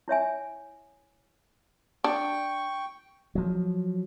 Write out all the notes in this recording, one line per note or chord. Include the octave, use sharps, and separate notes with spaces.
E4 C#5 E5 G#5
D4 G5 C#6
F3 F#3